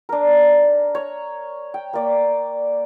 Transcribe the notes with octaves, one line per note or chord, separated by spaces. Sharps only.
D4 A#4
C#5
G5
A#3 D5